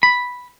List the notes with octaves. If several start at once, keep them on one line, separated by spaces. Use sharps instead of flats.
B5